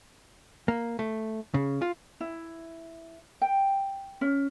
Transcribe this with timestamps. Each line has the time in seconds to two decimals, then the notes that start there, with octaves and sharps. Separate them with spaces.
0.68 A#3
0.99 A3
1.54 C#3
1.82 F4
2.20 E4
3.41 G5
4.21 C#4